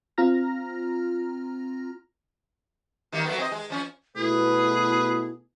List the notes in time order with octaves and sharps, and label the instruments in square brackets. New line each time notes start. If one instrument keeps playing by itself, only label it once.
[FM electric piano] C4 F4 A#5 F6 A#6
[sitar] D#3 G3 A#3
F#3 A3 B3
C4 D#5
G#3
F3 C#4
[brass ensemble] B2 A3 [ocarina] E4 [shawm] G#4 [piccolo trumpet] B4